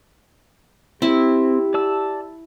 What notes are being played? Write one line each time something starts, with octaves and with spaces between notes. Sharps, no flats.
C4 E4 G4
D5 A5 E6